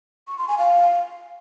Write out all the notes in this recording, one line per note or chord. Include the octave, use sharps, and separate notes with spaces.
C#6
C6
G#5
F5